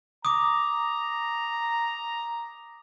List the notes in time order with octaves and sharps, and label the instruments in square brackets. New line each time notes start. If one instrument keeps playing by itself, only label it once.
[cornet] A#5 [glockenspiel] D6 D#6